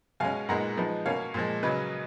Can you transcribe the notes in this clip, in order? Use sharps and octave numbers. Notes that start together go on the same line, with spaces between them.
B2 G#3 C#4 F5 G#5
A#2 G#3 B3 D#4 F#5 A#5
F3 G#3 B3 D#4
B2 A#3 C#4 C#5 F5
A#2 F3 G#3
C#3 F#3 C#4 B4 D#5